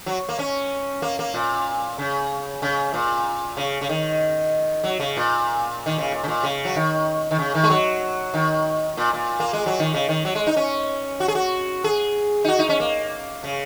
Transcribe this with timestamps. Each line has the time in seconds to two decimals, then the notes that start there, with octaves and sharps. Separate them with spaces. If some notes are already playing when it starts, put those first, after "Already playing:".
0.06 F#3
0.29 A#3
0.39 C#4
1.02 A#3
1.19 A#3
1.34 A#2
1.99 C#3
2.62 C#3
2.94 A#2
3.57 C#3
3.81 C#3
3.89 D#3
4.84 F#3
5.00 C#3
5.17 A#2
5.86 D#3
5.98 C#3
6.12 A#2
6.24 C#3
6.28 A#2
6.43 C#3
6.65 F#3
6.76 D#3
7.31 D#3
7.39 C#3
7.55 D#3
7.64 G#3
7.70 F#3
8.34 D#3
8.97 A#2
9.13 A#2
9.40 A#3
9.53 G#3
9.66 F#3
9.79 D#3
9.94 C#3
10.09 D#3
10.25 F#3
10.35 G#3
10.47 D#4
10.56 C#4
11.20 F#4
11.28 G#4
11.35 F#4
11.84 G#4
12.44 D#4
12.48 F#4
12.59 D#4
12.69 C#4
12.80 A#3
13.44 C#3